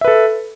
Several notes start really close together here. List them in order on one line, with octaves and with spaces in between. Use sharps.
E5 B4 A4